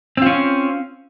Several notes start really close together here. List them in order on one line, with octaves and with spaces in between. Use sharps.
C4 F4 C#4